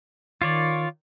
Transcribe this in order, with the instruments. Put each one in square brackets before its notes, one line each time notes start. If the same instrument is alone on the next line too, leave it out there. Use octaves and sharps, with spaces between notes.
[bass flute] D#3 [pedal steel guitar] F4 C#5 D5